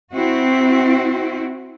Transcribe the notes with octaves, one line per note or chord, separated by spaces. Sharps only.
C4 E4 F#4